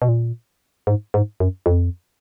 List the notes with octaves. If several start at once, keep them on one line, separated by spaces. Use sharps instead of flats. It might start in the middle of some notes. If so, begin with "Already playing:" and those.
B2
A#2
G#2
G#2
F#2
F2